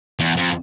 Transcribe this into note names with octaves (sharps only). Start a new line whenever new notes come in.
E2
F2